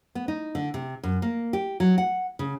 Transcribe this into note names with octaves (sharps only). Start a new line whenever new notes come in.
B3
D#4
D3
C3
F#2
A#3
G4
F#3
F#5
C#3